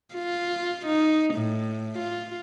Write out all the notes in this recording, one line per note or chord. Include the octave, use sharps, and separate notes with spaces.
F4
D#4
A2
F4